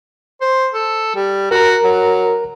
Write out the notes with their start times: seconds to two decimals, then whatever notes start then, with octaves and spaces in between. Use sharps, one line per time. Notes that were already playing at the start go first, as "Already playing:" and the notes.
0.41 C5
0.74 A4
1.16 G3
1.51 F#4 A#4 A#5
1.84 F#3